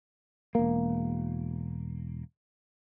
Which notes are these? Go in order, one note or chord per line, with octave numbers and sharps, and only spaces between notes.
E1 A#3